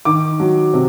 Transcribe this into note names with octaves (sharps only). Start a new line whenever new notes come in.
D#3 D6
F#3
C3